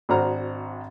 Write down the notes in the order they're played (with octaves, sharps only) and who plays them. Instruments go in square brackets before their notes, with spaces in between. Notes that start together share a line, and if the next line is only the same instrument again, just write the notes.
[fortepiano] G#1 D4 F#4 C5 A#5 F6